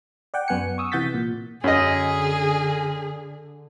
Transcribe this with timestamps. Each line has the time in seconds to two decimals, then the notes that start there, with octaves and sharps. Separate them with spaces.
0.34 D5 F#5 G5
0.48 F#2 B3 F#5 G#5 C#7
0.78 C#6 D#6 E6
0.92 C3 E3 F#5 G6 A6 B6
1.14 A#2
1.64 F#2 D3 G#4 D#5